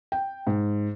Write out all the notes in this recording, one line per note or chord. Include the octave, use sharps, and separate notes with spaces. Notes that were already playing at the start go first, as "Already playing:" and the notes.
G5
G#2